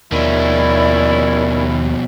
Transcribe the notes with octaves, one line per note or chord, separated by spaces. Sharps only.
D#2 B2 D#3 F3 C#4 E4 D5